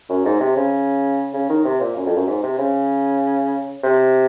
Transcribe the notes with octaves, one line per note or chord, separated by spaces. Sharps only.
F#2
G#2
C3
C#3
C#3
D#3
C3
A#2
F#2
F2
F#2
G#2
C3
C#3
C3